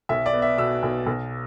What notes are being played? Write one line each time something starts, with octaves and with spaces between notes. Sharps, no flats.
B1 E5
D5
B3
E5
B2 E6
B1
B1